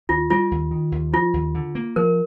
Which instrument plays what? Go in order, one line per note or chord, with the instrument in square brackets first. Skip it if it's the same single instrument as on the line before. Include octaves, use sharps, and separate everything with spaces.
[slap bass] D#2 [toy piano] F4
[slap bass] G3 [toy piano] F4
[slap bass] D#2
D#3
D#2
[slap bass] F3 [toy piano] F4
[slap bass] D#2
D3
A#3
[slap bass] F3 [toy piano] A#4